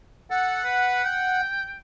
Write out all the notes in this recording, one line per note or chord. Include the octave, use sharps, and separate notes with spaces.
A4 F#5
B4
G5